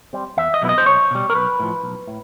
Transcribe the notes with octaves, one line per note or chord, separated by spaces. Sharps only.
G3 C4
E2 E5
D#5
B2 F#3 B3 E4
D#5
C5
B1 C#5
B2 G3
A#4
B1 B4
A2 F3
B1
A2